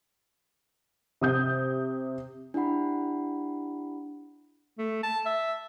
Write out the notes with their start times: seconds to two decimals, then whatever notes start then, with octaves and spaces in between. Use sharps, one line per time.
1.21 C3 D#6 G6
2.54 D4 E4 G4 F#5 B5
4.78 A3
5.03 A5
5.26 E5